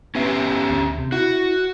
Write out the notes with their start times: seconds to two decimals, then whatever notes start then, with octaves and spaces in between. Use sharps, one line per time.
0.15 B3 C#4 G4 E5
0.70 D2
0.98 C3
1.12 E4 F#4